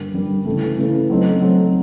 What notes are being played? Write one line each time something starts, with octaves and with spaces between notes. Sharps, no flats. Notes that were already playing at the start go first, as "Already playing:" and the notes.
Already playing: G2 D3 G3 A#3
G2 D3 G3 A#3
C#3 E3 A3
C#3 E3 A3
F#3 A3 C4 D#4
F#3 A3 C4 D#4